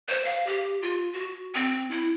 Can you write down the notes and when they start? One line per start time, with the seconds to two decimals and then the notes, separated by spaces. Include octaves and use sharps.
0.09 C5
0.25 F5
0.47 G4
0.82 F4
1.13 F#4
1.55 C4
1.91 E4